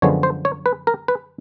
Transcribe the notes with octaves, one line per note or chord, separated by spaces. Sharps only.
F#2 D3 F3 G#3 B3 C#5
C5
C#5
B4
A#4
B4